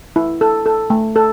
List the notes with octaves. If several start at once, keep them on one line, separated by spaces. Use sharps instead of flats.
E4
A4
A4
A3
A4